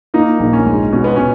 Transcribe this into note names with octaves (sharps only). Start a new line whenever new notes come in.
A#3 D#4
A#1
C#4
G#2
B2 C#4
B3
B2 C#4